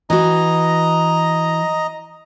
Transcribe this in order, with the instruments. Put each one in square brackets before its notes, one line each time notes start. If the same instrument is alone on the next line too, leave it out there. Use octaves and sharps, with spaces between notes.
[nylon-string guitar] E3 F#4 [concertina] D#5 A#5